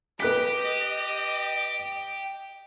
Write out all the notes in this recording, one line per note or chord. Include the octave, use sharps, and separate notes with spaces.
G4 B4 D#5 F#6 B6